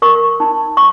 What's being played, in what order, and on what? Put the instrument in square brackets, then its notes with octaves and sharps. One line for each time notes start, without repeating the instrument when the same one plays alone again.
[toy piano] A#4 C#6
D#4
C#6